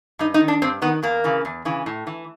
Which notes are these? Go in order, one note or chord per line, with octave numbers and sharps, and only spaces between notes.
G2 D#4
D#4
D#3
D4
G2 C4
D#3 B3
E2 A#3
C#3 E3
E2
C#3 E3
A2
E3